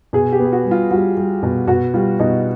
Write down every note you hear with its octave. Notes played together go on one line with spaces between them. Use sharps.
B2 G#4
G4
B3
G4
F#4
G3
F4
G3 F#4
G3
B2
B2 F#4
G3 F4
B2 D#4